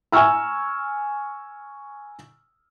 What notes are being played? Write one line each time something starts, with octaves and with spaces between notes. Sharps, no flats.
G#5 A#5 C#6 E6 F6